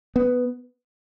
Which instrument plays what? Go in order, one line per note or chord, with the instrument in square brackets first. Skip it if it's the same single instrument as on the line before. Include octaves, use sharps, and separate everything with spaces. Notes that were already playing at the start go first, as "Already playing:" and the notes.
[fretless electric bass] B3